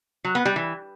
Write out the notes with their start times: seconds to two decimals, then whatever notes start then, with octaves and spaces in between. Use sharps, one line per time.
0.24 F#3
0.35 B3
0.45 G3
0.56 E3